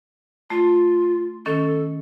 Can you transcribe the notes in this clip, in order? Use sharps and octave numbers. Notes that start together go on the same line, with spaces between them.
A3 F4
D#3 C#4 A4 A6